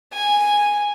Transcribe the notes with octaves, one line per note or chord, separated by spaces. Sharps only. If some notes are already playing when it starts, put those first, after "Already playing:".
G#5